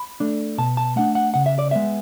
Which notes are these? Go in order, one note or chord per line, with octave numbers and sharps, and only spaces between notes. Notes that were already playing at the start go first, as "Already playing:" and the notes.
Already playing: B5
A3 D4
B2 A5
A5
A3 D4 F#5
F#5
C#3 F#5
E5
D5
G#3 B3 E5